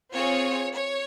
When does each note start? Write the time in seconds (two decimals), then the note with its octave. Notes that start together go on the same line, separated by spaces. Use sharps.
0.12 C4 F4 G#4 C#5
0.73 C#5